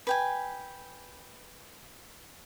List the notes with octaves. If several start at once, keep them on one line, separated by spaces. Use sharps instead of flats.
B4 G5 G#5